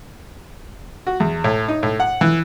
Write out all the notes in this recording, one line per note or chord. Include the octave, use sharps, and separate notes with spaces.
F#4
E2
A2
D#4
A2
F#5
E3